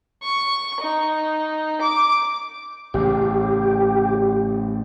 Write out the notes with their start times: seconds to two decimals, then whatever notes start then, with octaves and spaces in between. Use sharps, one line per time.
0.23 C#6
0.81 D#4
1.81 D6
2.94 A1 C#3 G4